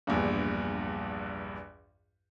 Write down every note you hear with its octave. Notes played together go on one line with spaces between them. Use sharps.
A#1 E2 G2